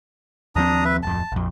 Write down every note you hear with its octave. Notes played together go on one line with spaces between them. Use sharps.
D#2 F3 C4 D4 A#5 D#6
B4 E5
D1 F2 A5
A#1 F2